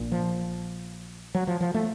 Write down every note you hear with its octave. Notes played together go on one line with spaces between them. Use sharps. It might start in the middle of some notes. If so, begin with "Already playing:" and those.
Already playing: A#1 A#2
F3
F#3
F3
F3
A3